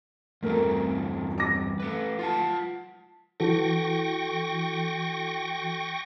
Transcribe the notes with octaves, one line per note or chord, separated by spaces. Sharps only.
E2 G2 A3 C4 A#4
D6 A#6
A3 B4
F4 F#5 A5
E3 F#4 A4 G5 C#6 A#6